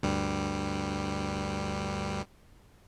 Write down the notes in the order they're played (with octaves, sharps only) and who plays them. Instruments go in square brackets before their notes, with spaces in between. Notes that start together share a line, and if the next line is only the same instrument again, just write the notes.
[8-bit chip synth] D2 G2 G3